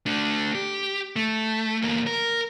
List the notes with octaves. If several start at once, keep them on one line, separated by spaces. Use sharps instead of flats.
A3 D4
G4
A3
E2 A#3
A#4